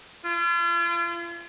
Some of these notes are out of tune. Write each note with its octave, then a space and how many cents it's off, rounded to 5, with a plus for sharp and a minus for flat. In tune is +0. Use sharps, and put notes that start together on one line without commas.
F4 -40